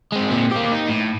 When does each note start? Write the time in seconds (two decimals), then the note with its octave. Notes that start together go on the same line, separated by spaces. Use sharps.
0.12 G#3 C4
0.30 A#2 C4
0.51 A#3 G4
0.72 D#4
0.89 A2